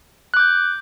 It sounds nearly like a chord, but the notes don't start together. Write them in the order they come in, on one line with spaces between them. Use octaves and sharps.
F#6 D6 G6